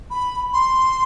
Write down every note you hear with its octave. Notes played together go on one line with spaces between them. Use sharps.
B5
C6